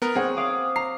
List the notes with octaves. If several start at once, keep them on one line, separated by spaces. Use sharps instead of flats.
B3 A#4
C4 G#4 C#5 F#5
F5 D6 D#6
A#5 C7